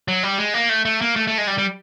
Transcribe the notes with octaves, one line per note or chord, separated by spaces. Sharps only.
F#3
G3
G#3
A#3
A3
A3
A#3
A3
A3
G#3
G3
G3